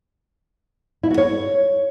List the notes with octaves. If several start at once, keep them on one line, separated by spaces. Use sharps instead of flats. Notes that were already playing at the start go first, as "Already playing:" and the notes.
E4
F#4
C#5